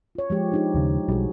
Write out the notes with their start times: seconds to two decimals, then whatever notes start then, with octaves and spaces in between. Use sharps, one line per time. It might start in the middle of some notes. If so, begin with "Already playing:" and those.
0.15 F4 C#5
0.30 F3 G#3 G4
0.52 D4 D#4 G4
0.75 D#2 C#3
1.08 B1 G3 F#4 G#4